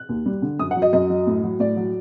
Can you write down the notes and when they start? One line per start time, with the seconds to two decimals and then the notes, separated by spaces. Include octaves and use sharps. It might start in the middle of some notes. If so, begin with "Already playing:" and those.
Already playing: F#6
0.09 D#2
0.26 G3
0.42 D3
0.59 F#2 D#6
0.71 F#5
0.76 F#3
0.82 D#5
0.93 F#2 D#5
1.10 F#3
1.27 A2
1.43 F#3
1.60 A2 D5
1.76 F#3